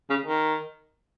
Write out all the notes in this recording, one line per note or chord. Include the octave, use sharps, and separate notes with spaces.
C#3
D#3